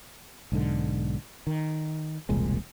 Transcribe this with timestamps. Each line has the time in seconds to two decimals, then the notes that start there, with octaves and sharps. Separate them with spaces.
0.52 B1 G#2 D3
1.47 D#3
2.29 E1 C2 A#2 G#3